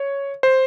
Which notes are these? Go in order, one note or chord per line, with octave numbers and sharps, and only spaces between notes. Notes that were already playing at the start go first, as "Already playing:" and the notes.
Already playing: C#5
C5